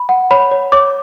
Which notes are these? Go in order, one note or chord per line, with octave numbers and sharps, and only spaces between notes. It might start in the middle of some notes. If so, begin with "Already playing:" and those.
Already playing: B5
F#5
C#5 B5
C#5
C#5 D6